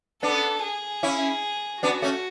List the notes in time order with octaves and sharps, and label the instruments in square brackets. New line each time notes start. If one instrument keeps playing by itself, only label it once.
[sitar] B3 D4 [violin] A4
[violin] G#4
[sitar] C#4 E4
[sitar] B3 D4 [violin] F#4
[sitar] A3 C#4